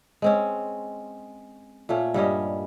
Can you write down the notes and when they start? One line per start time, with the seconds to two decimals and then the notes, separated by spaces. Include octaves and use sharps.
0.22 G#3 C4 C#4
1.89 A#2 A3 C#4
2.14 G2 G3 C#4 D#5